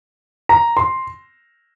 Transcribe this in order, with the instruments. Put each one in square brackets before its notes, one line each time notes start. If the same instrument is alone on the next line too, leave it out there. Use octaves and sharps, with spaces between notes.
[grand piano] A#5
C6